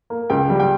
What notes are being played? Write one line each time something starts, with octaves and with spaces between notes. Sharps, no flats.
A#3
C#2 G5
G3
G5